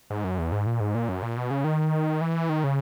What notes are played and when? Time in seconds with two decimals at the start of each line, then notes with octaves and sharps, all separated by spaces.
0.10 G#2
0.24 F#2
0.38 E2
0.52 G#2
0.66 A#2
0.80 G#2
0.95 A#2
1.09 F#2
1.22 A#2
1.37 B2
1.51 C#3
1.64 D#3
2.21 E3
2.49 D#3
2.64 C#3